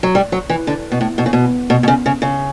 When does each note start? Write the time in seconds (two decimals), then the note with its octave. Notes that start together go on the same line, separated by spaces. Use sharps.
0.03 F#3
0.15 G3
0.32 F#3
0.49 E3
0.67 D3
0.92 B2
1.01 A2
1.18 B2
1.26 C#3
1.33 B2
1.70 B2
1.83 B2
1.88 C#3
2.06 C#3
2.22 C#3